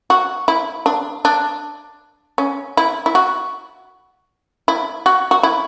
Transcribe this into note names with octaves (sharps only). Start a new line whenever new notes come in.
F#4
E4
D4
D4
C#4
E4
E4
F#4
E4
F#4
F#4
E4